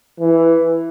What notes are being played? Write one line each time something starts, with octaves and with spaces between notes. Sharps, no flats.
E3